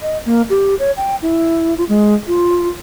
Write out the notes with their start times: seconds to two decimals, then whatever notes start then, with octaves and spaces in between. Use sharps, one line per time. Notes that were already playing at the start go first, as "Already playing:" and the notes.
0.02 D#5
0.26 A#3
0.50 G4
0.79 C#5
0.97 G5
1.22 E4
1.77 F4
1.89 G#3
2.27 F4